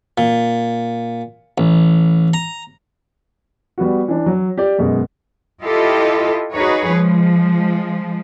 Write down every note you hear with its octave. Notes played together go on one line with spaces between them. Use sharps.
A#2
A1
A#5
G3 B3 F#4
E3 D4
F#3
G4 D5
F#2 B2 G#3
E4 F4 G4 A4 D#5
D#4 F#4 G#4 B4 C#5
F3 G#3